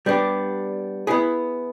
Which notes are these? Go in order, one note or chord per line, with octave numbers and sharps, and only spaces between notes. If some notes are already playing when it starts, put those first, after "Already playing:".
G3 B3 D4 G4
B3 E4 G#4